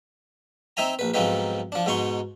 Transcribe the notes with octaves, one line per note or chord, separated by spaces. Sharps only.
C4 D#4 E5 G#5 A#5
A#1 B4
B1 G#2 F3 C4 D#4 B4
F3 D4
G#2 B2 D#4 C6 C#6